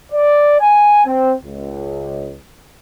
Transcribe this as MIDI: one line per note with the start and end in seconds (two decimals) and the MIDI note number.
0.12 0.60 74
0.60 1.03 80
1.05 1.33 60
1.43 2.35 37